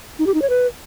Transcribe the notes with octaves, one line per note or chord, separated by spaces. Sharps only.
D#4
G4
D#4
C#5
B4